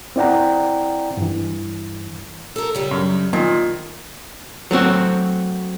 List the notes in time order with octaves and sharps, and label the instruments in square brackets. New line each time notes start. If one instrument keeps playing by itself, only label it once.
[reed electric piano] C4 E4 D5 F#5 G5 A#5
G2 E3
[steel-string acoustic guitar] A4 A#4
C#3 G3 G4
[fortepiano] F#2
[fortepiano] A#2 D#3 [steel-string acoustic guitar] F3
[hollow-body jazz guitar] F#3 A3 C4 F#4